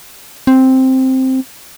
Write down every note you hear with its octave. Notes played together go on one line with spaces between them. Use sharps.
C4